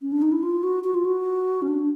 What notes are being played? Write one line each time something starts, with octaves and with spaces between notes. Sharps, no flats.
C#4
D4
D#4
E4
F4
F#4
F#4
F4
F#4
C#4
D4